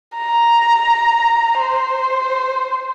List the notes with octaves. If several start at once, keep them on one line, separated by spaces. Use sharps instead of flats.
A#5
C5